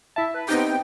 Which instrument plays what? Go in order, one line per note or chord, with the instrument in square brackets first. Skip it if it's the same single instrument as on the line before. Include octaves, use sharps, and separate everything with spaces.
[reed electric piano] E4 A5 [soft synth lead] E5
[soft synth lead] B4
[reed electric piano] B3 C4 G4 [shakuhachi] D#4 [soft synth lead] G5